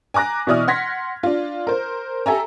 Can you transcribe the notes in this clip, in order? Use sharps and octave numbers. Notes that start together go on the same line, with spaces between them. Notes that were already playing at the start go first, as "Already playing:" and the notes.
G#5 A#5 D6 F#6 A#6
B2 E3 E4 D5 D#6 F6
F#5 C6 G#6 A#6 B6
D4 F4
A#4 C5
G4 A4 E5 G#5 A#5